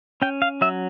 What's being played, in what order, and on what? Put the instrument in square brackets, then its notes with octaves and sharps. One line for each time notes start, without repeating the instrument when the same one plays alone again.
[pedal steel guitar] C#4 G5
F5
F#3 E5